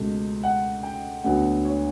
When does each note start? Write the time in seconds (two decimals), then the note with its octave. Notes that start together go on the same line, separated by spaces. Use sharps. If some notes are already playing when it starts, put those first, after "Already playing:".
Already playing: C#2 B2 A3
0.44 F#5
0.83 G5
1.24 D2 D3 F#3 B3 F#5
1.65 C#5